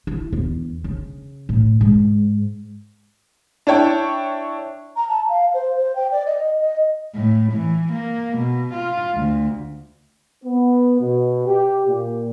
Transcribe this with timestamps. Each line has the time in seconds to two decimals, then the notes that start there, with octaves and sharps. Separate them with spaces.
0.07 E4
0.33 E2
0.84 C#3
1.49 A2
1.81 G#2
3.67 D4 E4 C#5 G5 C#6
4.96 A#5
5.09 A5
5.29 F5
5.54 C5
5.76 C5
5.96 G5
6.12 D5
6.26 D#5
6.61 D#5
7.14 A2
7.52 E3
7.92 A#3
8.37 B2
8.73 F4
9.15 D2
10.44 B3
11.00 B2
11.46 G4
11.86 A#2